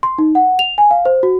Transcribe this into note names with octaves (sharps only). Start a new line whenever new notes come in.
C6
D#4
F#5
F7
G#5
F5
C5
F#4